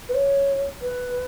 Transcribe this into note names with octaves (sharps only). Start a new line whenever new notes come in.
B4
C#5
B4